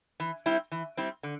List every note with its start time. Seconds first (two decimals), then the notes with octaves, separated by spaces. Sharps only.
0.20 E3
0.46 G3 C4 E4
0.72 E3
0.97 G3 C4 E4
1.23 D3